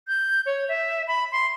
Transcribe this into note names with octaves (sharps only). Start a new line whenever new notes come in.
G6
C#5
E5
B5
C6